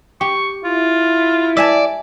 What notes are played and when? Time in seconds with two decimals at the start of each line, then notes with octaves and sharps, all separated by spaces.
0.21 G4 C#6
0.64 E4 F4
1.57 D5 E5 G#5 A5